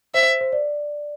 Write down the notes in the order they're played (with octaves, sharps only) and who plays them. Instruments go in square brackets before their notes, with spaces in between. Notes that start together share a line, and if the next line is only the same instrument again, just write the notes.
[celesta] C5 [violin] E5
[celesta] C5
D5